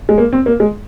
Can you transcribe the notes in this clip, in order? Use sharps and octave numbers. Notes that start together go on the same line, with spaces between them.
G#3
A#3
C4
A#3
G#3